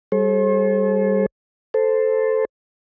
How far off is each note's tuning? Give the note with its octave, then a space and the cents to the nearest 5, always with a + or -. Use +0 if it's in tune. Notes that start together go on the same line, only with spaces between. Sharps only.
G3 +0 A4 -40 C5 +45
A4 +0 C5 +0